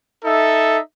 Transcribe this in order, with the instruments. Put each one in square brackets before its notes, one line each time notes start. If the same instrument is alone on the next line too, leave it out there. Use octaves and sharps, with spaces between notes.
[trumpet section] D#4 A4 E5